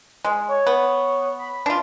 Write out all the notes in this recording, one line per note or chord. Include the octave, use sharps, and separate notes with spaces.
G#3
C#5
B3
B5
D4 F4